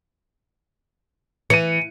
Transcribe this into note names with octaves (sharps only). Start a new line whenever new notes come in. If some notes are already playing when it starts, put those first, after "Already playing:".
E3 C#7 D#7